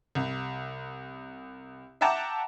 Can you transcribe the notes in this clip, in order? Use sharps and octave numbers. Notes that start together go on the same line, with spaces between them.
C2
E5 F#5 G5 A5 A#5 D6